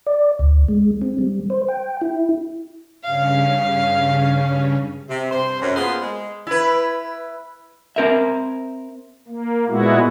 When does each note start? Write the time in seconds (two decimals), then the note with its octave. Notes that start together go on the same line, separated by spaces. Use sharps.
0.07 D5
0.39 D2
0.69 G#3
1.02 C4
1.18 G3
1.50 C5
1.68 G5
2.01 E4
3.04 G2 C#3 C#4 F5
5.09 C3
5.32 G2 C3 C5
5.62 F#2
5.76 A#3 B3 F4 G#4 C5
6.01 G#3
6.47 E4 B4
7.96 C4 A#4 E5
9.28 A#3
9.68 A#2 G#3 B3 E4 F#4